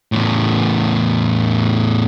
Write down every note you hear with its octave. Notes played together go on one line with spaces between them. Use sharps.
E2 A2